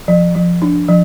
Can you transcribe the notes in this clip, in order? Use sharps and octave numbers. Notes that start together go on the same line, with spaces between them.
F3
F3
D4
F3